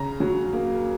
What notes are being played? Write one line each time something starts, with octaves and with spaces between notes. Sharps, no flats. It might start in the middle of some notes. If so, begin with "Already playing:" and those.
Already playing: C#3 A#5
F#3
A#3